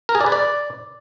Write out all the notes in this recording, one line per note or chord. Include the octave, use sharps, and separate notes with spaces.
A#4
G#4
D5
B4
D5